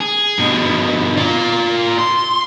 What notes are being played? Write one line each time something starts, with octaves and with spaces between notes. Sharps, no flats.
G#4
G2 B2
F4 D5
C6